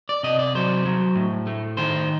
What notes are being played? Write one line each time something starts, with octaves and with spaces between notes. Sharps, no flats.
D5
C3 D#5
D5
F#3 C5
F#3
A2
A3
D#3 C5